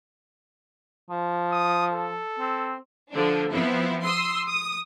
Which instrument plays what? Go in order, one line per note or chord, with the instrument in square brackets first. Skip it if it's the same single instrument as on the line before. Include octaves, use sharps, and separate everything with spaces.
[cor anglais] F3
[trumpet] D#6
A4
[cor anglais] C4
[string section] D3 F3 D4
F3 B3 C4 E4
C6 D#6 E6
D#6